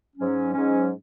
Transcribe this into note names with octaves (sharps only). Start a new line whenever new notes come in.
G#2 F#3 C#4
G#2 F#3 C#4